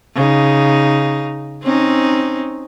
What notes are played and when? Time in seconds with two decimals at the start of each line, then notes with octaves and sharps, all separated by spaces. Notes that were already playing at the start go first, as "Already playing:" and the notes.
0.15 C#3 D#4
1.62 C4 C#4 D#4